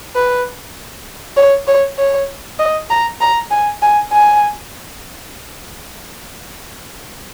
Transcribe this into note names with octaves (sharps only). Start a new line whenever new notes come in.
B4
C#5
C#5
C#5
D#5
A#5
A#5
G#5
G#5
G#5